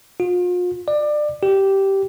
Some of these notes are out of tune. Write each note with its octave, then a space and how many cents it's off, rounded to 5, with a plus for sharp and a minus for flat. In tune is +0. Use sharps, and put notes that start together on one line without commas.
F4 +40
D5 +25
G4 -10